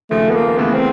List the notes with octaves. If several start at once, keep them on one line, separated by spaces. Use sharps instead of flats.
D#2 C#3 F3 A3
B3
A#3
C#2 C#3 E3 A3 B3
C4